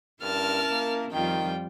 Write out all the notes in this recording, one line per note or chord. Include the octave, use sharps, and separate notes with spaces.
G2 C#4 E4 A#4 A5 F6
A#3
F2 D#3 G3 F4 G5